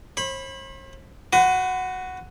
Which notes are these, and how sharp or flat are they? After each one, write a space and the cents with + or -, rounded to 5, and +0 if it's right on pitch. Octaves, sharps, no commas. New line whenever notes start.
C5 +45 B5 +0
F#4 +0 B4 +40